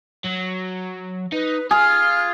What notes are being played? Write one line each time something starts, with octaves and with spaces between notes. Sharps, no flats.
F#3
D#4 B4
F4 G#4 F5 F6